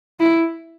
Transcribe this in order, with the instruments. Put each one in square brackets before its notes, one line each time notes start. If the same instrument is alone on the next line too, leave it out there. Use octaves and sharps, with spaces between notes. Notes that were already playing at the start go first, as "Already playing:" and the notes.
[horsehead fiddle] E4